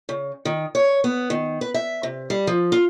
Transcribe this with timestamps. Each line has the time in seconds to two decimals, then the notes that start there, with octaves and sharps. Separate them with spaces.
0.09 C#3
0.45 D#3
0.75 C#5
1.04 B3
1.30 D#3
1.61 B4
1.74 E5
2.03 C3
2.30 G3
2.47 F3
2.72 F4